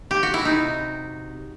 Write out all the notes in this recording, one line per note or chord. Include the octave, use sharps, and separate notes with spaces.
G4
F#4
E4
C3 D#4